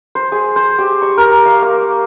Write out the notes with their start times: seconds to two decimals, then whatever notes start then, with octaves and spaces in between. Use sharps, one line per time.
0.15 C5
0.32 G#4
0.56 C5
0.78 G4
1.02 C#6
1.18 A#4
1.45 F5
1.62 A#3